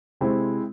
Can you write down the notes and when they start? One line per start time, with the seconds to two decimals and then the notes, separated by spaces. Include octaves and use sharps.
0.21 C3 G#3 C4 E4